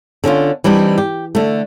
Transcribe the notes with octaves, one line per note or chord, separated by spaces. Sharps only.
D3 C#4 D4 F4
E3 G3 C4 D4 D#4
G4
D3 A3